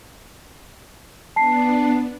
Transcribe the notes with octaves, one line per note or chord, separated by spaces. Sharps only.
B3 D4 A5 C7